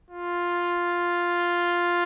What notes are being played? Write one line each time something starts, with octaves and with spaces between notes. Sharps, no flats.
F4